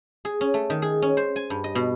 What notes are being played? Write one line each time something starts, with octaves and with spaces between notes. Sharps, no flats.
G#4
C#4
A3
D#3
G#4
C#4
C5
G#5
G2
D#5
B2